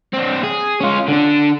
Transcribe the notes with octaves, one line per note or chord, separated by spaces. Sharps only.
C4 D4
G#4
C#4 F4
D3 D4